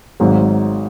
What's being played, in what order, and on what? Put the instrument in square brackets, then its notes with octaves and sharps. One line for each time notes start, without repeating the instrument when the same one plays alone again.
[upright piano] G#1 G#2 F#3